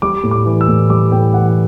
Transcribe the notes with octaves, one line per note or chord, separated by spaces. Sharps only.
G3 D6
A2
D6
E3
E6
A2
G3 D6
A2 G5
E3 F#5